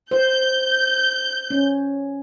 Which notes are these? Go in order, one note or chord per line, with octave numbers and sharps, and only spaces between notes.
C5 G6
C#4